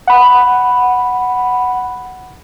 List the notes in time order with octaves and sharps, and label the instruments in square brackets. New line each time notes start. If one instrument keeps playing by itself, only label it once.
[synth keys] F#5 B5